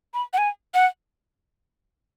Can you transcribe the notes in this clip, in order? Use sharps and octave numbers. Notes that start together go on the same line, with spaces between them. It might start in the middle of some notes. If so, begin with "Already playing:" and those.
B5
F#5
G#5
F#5